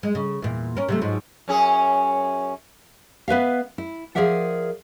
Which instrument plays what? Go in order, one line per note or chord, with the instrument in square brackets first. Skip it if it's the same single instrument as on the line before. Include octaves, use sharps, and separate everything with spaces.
[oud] G#3
C#3
E2 A#2
C#4 A#4
C3 F#3 A3
G#2 F3 F#3
[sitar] F#2 C#4 G#4
[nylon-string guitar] B3 B4 E5 F5
E4
F3 G#4 A#4 D5 E5 F#5